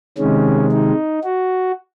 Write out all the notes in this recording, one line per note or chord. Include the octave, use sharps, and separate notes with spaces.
C3 D#3 G#3 C#4
D#4
F#4